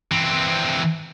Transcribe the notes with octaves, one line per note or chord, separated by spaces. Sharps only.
E3 C4